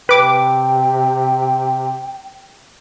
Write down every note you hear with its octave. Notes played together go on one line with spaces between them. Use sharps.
C3 B4 G5 D6